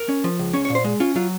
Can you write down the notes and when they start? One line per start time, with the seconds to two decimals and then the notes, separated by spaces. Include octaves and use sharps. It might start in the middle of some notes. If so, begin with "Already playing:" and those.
Already playing: A#4
0.09 C#4
0.24 F3
0.39 C#2
0.53 C#4 C#5
0.65 C#5
0.70 A#2
0.75 C5
0.84 G#3
1.00 C#4 F4
1.16 F#3 F4